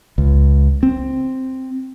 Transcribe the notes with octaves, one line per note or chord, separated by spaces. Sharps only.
C#2
C4